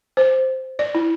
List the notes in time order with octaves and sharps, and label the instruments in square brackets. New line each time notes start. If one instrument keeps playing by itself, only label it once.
[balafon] C5
D5
E4